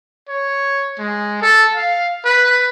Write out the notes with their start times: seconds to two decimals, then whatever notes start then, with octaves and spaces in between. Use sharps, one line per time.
0.29 C#5
0.99 G#3
1.42 A4
1.75 F5
2.25 B4